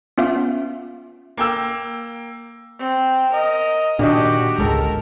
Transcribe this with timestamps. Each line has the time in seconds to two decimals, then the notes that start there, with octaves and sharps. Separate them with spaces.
0.18 B3 C#4 F4 E5 F5
1.37 A#3 G5 E6
2.79 C4
3.33 A#4 D#5
3.99 A#2 D#3 D4 F#4 G4 D#5
4.58 G1 C#2 G#2 G#3 A4 A#4